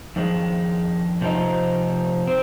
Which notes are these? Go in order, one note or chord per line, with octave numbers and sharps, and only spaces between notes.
F2 D#3 G#3
C3 F3 C4 D#4
C4